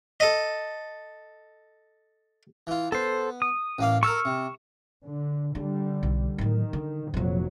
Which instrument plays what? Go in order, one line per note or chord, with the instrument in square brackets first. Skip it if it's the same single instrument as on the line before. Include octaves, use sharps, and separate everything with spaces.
[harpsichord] A4 D#5
E3 F4
[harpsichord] B3 [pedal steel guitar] A4 C5
[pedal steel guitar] D#6
[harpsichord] A1 A#3 F5
[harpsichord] A4 A#4 [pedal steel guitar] C#6 E6 F6
[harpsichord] C3
[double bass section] D3
[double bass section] D3 G3 [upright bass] D4
[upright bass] B1
[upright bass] A2 F#3 [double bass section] D#3
[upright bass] D3
[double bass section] F1 F#3 [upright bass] A#2 F3